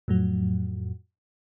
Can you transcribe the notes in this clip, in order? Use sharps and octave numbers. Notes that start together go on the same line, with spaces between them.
F2 A2 F#3